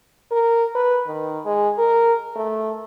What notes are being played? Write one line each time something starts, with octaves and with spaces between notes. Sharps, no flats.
A#4
B4
D#3
G#3
A#4
A3